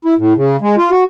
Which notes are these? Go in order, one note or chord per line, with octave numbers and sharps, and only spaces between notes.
E4
A2
C#3
G#3
F4
F#4